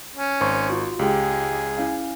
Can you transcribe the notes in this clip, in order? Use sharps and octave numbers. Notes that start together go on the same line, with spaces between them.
C#4
G#1 C5 C6 C#6
F4 F#4
C#2 G#3 G4 G#4 G5
C#4 E4 F5